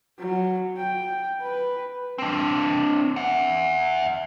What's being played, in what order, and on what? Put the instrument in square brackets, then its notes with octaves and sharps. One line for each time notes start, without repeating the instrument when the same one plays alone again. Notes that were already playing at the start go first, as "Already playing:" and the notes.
[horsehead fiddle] F#3
G5
B4
[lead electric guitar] C4 D4
E5 F#5